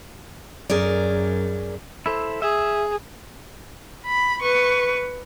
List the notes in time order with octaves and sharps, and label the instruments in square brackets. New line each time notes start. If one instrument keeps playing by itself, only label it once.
[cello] F#2 [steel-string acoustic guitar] G#4 A#4 D5
[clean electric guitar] E4 A4 C5
[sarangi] G#4 [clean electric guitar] E5
[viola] B5
B4 C#6